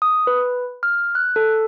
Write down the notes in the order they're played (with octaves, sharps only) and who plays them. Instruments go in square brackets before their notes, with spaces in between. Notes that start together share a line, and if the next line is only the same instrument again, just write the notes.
[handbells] D#6
B4
F6
F#6
A4